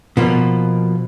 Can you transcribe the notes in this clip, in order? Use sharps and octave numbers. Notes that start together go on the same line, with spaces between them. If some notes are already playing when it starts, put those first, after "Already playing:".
B2 F3 A#3